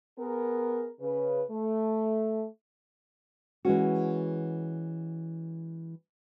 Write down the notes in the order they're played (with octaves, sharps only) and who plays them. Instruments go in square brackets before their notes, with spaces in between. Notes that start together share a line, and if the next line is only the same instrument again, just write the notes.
[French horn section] B3 G#4 A#4
C#3 B4
A3
[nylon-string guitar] E3 G#3 C#4 F#4